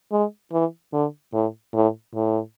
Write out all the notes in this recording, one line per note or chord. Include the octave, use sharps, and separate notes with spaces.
G#3
E3
D3
A2
A2
A2